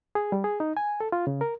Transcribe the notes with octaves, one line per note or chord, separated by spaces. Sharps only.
G#4
G3
G#4
D#4
G#5
A4
F4
C#3
A#4